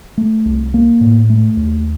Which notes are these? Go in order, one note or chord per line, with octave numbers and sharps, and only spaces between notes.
A3
C2
A#3
A2
A3
D#2